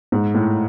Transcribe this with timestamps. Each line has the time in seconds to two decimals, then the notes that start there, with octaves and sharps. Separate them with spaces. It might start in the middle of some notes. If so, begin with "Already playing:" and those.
0.12 G#2
0.35 A2